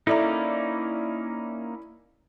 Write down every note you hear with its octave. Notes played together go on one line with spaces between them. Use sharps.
A#3 C#4 D#4 E4 A4 D5 E5 A#5